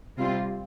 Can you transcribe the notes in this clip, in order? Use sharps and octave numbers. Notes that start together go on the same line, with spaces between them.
C3 G3 C4 F4